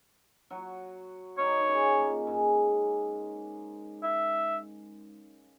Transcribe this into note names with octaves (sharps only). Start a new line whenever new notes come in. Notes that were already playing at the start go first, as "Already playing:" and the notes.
F#3 F#4
D#3 D#4 C#5
D#4
C#3 C#4
A#2 A#3
G#2 G#3
E5